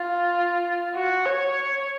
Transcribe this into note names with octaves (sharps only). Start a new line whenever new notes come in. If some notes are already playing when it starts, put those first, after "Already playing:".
Already playing: F4
F#4
C#5